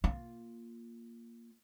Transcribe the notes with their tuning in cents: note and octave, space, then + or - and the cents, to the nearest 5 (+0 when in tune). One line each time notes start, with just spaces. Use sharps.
A#3 +0 F4 +0